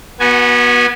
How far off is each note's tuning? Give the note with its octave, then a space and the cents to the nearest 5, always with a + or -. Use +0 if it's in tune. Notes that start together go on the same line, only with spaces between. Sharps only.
B3 -25 F#4 +0 G#5 +0